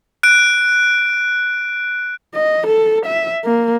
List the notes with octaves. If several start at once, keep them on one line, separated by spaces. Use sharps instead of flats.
F#6 D7
D#5
A4
E5
A#3